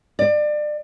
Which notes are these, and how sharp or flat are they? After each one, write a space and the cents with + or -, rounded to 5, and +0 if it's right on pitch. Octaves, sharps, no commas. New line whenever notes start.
D5 +30